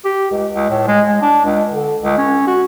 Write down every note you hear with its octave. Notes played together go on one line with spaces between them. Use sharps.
G4
C#2
C#2
A2
G#3
G#3
D4
C#2
D3
C#2
C#4
F#4